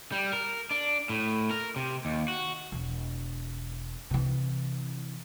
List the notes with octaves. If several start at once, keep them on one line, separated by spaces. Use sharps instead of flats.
G3
A#4
D4
A2
A#4
C3
D#2
F#4
E1
C3 E3